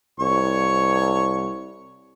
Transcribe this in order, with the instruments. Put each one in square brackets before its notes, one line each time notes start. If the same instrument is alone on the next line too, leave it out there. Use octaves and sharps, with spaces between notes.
[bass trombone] C2 [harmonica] C#5 C#6